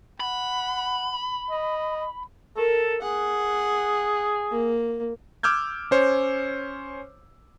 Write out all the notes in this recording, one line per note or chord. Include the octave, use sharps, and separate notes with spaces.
F#5 B5
D#5
A4 A#4
G#4 F#5
A#3
D6 E6 F6 G6 G#6
C#4 C5 C#5